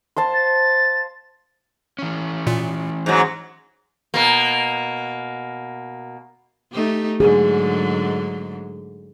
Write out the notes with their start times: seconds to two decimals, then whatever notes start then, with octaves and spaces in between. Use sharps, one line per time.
0.16 C5 F5 A5
0.34 A6
1.99 E3 C#4
2.47 A#2
3.06 G#2 F#3
4.14 B2 A#3
6.72 A3 D#4 G4
7.20 G#2 D3 F#3 G#4